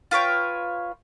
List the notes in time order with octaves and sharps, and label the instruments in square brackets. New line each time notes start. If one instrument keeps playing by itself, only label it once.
[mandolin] F4 B4 C#5 G5